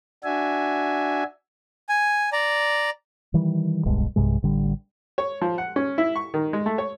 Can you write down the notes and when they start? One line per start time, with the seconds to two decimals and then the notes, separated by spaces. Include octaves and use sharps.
0.24 D4 F#4 E5 G#5
1.89 G#5
2.33 D5 A#5
3.34 D#3 E3 G3
3.85 D1 B1 G2 G#3
4.16 B1 G2 C3 G#3
4.43 A1 D3 G3
5.18 C#5
5.42 F3
5.58 F#5
5.76 C#4
5.98 E4
6.16 C#6
6.34 D#3
6.53 G#3
6.66 A3
6.78 C#5